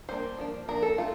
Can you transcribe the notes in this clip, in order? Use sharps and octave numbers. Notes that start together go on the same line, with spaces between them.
G3 A#3 D4 C5
F3 A#3 D4
F3 A#3 D4 A#4
A4
A3 C4 F4